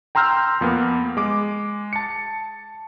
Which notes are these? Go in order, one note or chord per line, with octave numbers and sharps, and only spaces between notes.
G5 A#5 C6 E6 F6 G6
F2 A#3 B3
G#3 D6
A5 C#7